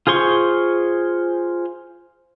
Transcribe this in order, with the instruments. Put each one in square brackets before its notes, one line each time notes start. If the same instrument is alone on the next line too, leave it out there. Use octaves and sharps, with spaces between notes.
[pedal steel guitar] F4 G#4 C5 C6 C#6